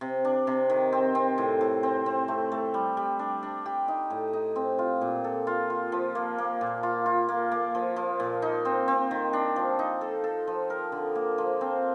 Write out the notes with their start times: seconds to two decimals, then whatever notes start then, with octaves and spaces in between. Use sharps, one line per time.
0.01 C3
0.25 D4
0.47 C3
0.70 D#3
0.92 C4
1.15 C4
1.38 A2
1.61 A2
1.83 C4
2.06 C4
2.28 A3
2.52 A3
2.74 G3
2.97 G3
3.19 D4
3.43 D4
3.66 G4
3.88 D#4
4.10 A2
4.33 D#4
4.56 C4
4.79 F4
5.01 A#2
5.24 A4
5.47 F4
5.70 F4
5.92 F3
6.15 A#3
6.38 A#3
6.61 A#2
6.83 F4
7.06 F4
7.29 A#3
7.51 A#3
7.75 F3
7.96 F3
8.20 A#2
8.42 D#4
8.65 C4
8.88 C4
9.11 D#3
9.33 D4
9.56 F3
9.79 D#4
10.01 A4
10.24 A4
10.47 F3
10.70 A#4
10.92 D3
11.15 A#3
11.38 F3
11.61 C4